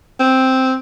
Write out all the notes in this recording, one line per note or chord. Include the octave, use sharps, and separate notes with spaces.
C4